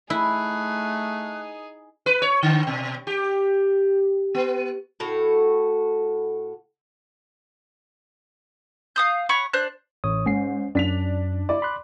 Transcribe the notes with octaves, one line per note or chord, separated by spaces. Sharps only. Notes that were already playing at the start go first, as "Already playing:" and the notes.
A3 D#4 E4 G#4 F#6
B4
C#5
D3
B2
G4
B3
A2 F#4 A4
F5 D#6 G6
C#5 F#5 B5 C#6
D4 C5 F#6
A1 C#5 D#6
G#2 C#4 C7
F#2 D4 B6 F7
E4 D5
B5 C6 F#6